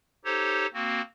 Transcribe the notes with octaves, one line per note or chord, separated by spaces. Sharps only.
D#4 G4 A4 C5 C#5
A#3 C4 F#4